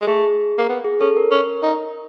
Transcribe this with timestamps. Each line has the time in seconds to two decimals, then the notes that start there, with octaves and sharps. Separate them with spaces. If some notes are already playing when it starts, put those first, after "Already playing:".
0.02 G#3
0.07 A3 G#4
0.58 A#3
0.69 B3
0.85 G#4
1.01 C#4 A4
1.17 A#4
1.31 C#4
1.63 D#4